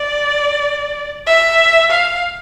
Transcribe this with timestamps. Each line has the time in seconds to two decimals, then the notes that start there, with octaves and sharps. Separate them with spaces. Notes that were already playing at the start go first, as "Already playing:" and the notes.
Already playing: D5
1.27 E5
1.90 F5